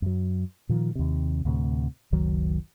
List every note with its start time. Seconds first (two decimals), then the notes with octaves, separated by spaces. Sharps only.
0.02 F#2 F#3
0.69 A#2 D#3 F3
0.95 D#2 C3
1.45 D2 A2 C3
2.12 F#1 C#2 D#3 F#3